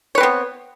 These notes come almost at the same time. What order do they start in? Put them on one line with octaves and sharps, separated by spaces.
C#5 B4 C4 B3